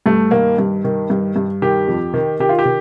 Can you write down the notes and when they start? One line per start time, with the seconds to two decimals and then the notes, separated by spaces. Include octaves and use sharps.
0.06 G2 A3
0.31 D#3 A#3
0.58 G2
0.84 D#3
1.10 G2
1.36 G2
1.62 D#3 G4
1.88 F2
2.14 D#3
2.40 D#3 G4
2.49 F4
2.59 G4
2.65 D#3